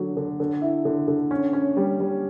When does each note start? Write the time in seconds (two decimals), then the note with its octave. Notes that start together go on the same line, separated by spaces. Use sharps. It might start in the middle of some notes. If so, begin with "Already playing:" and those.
Already playing: D3 F#3
0.17 D3
0.40 D3
0.62 E4
0.85 D3
1.08 D3
1.31 C#4
1.53 C#4
1.77 G3
2.00 G3